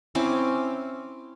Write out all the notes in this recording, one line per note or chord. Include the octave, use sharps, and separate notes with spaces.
C4 C#4 E4 D6